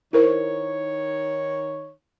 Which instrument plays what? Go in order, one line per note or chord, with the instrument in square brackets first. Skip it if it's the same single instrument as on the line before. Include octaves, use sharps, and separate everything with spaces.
[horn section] D#3 D#4 C#5 [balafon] E4 A#4 C5